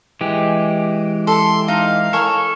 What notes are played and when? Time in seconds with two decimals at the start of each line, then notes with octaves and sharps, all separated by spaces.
0.21 E3 G#3 G4
1.27 A4 C6
1.68 D#4 F5
2.13 A4 A#4 C#5 G#5